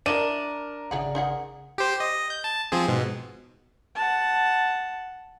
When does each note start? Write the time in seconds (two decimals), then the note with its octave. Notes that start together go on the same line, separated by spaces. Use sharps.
0.06 D4 E4 A#4 D#5 E5 D#7
0.91 G#1 C#3 E4 G#4 D5 F#5
1.15 D#4 G#4 F#5
1.78 G4 C5
2.00 D#5
2.30 G6
2.44 A5
2.72 F3 C4 G#4
2.88 G#2 B2
3.95 F#5 A5